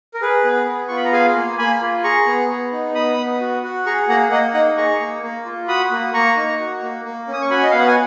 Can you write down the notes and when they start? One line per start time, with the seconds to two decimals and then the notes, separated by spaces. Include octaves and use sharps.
0.14 A#4
0.21 G#4 B4
0.44 B3
0.67 B3
0.88 F4 C#6
0.96 B5
1.05 A#5
1.12 G#4 F5 G#5
1.36 A#3
1.58 A#3 G#5 B5
1.81 F4
2.04 G#4 A#5 C#6
2.26 B3
2.50 B3
2.72 D#4
2.95 B3 B5 D#6
3.18 B3
3.40 F#4
3.63 F#4
3.86 G#4 A#5 C#6
4.09 A#3 F#5 A#5
4.31 A#3 D#5 F#5
4.54 D#4 D#5 F#5
4.77 G#4 A#5 C#6
5.00 A#3
5.23 A#3
5.45 F4
5.68 F#4 B5 D#6
5.91 A#3
6.14 A#3 A#5 C#6
6.37 D#4
6.59 F#4
6.82 A#3
7.05 A#3
7.27 C#4
7.33 D#6
7.41 C#6
7.50 F#4 G#5 B5
7.63 D#5
7.71 B3 F5
7.79 F#5
7.87 G#5